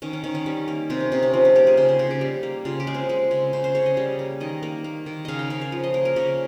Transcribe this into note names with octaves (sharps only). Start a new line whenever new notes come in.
D#3 C#4
C#4
D#3 C#4
C#4
G3 C#4
A#3
C3 C4
C#4
C3 D#4
C#4
F3 C4
C#4
A#3 G4
G#4
C#3 C5
C5
C#3
G4
G3
A#3
C#3 F4
G4
G#3
C4
G#3
C#3
C#3 C5
C5
C#3 C#5
D#5
G3
A#3
D#3 D#5
A#3
A#3
D#3
C#3 D#5 F5
G5
C#3 F5
C#5
F3
D#5
A#3 A#4
A#4
C#3 C#4